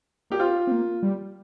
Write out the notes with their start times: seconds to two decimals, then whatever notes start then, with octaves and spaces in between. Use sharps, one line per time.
0.30 A#3 G4
0.39 C4 F4
0.67 C4
0.72 A#3
1.03 G3